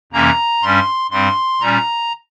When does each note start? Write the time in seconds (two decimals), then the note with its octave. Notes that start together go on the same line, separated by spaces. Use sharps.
0.12 F2 C3 E3 A#3 C#4 A#5
0.62 G2 G3 C#4 C6
1.11 G2 G3 C4 C6
1.61 A#2 G3 C#4 A#5